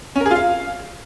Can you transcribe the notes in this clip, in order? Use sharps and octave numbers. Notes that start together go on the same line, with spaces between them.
C#4
A#4
G#4
F4
F5